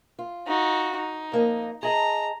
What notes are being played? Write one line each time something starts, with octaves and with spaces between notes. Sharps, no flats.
F4
D#4 F#4
D#4
F2 A#3 D#5
G#4 D#5 A5 A#5